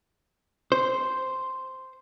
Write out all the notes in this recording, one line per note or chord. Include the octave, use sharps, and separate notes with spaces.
C5